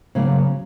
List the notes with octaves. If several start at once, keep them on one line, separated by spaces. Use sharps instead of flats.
C#3 F#3 A#3